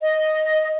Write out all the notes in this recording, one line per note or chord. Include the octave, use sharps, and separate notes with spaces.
D#5